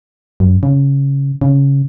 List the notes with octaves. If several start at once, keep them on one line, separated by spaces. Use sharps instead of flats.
F#2
C#3
C#3